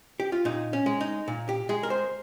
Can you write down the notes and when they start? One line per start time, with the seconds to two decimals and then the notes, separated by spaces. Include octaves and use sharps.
0.20 G4
0.32 F4
0.45 A#2 D#4
0.73 C#4
0.86 G#3
1.01 D#4
1.28 A#2
1.49 G4
1.69 G#3 G#4
1.83 A#4
1.90 C5